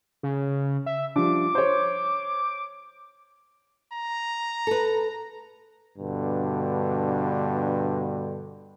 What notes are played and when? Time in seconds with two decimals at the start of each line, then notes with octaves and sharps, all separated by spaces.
0.23 C#3
0.86 E5
1.16 F3 G3 D4 D6
1.55 C5 C#5
3.93 A#5
4.67 A4 B4
5.98 G2 B2 D3